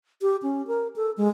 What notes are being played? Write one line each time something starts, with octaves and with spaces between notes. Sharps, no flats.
G4
C#4
A#4
A4
G#3